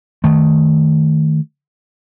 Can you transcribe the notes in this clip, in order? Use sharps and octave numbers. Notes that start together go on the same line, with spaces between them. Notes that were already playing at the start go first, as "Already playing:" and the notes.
D#3 A3